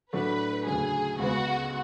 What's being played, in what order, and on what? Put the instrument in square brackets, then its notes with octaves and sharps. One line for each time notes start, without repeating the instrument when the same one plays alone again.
[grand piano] A2 F#3 A3 D4 F#4 [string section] B4
[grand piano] D2 C#3 F#3 [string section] G#4
[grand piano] C#2 C#3 G#3 B3 [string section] F#4